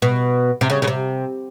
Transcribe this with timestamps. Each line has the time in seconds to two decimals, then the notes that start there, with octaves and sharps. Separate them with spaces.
0.02 B2
0.61 C3
0.70 C#3
0.82 C#3
0.87 C3